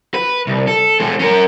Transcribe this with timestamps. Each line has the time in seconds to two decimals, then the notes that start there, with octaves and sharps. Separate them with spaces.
0.14 B4
0.47 C2
0.68 A4
1.00 E3 G#3
1.19 C#4 A#4